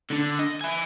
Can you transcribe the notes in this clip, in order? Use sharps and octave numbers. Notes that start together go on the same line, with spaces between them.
D3 D4
D#5
E5 G#5